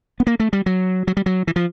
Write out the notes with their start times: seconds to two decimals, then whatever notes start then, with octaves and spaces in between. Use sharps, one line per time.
0.20 B3
0.27 A#3
0.40 A3
0.53 G3
0.66 F#3
1.07 F#3
1.17 G3
1.26 F#3
1.47 E3
1.56 F3